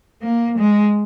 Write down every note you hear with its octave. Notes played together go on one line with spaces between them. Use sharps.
A#3
G#3